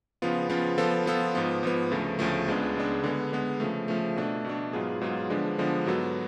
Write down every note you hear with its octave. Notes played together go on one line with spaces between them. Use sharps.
C#3 F3 B3 F4
C#3 F3 B3 F4
F3 B3 F4 A4
F3 B3 F4 A4
G#2 F3 B3
G#2 F3 B3
D2 C#3 F3 A3
D2 C#3 F3 A3
C#2 C#3 G#3 B3 D4
C#2 C#3 G#3 B3 D4
D3 G#3 B3
D3 G#3 B3
C#3 F3 A3
C#3 F3 A3
B2 A3 D4
B2 A3 D4
G#2 F#3 B3 F4 G#4
G#2 F#3 B3 F4 G#4
D3 F3 G#3 B3 D4
D3 F3 G#3 B3 D4
G#2 F#3 B3 F#4 A4